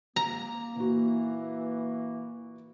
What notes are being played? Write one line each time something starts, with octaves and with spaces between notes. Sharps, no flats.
A#3 A#5
A#2 E3 F#4